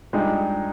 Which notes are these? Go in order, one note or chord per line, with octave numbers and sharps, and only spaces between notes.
G2 F3 G#3 D#4 G4